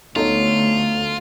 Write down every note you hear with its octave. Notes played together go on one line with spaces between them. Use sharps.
D2 F#3 A3 B3 C#4 D#4 F4 A4